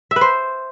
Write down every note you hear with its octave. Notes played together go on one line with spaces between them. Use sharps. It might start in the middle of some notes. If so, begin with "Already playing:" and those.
E5
B4
C5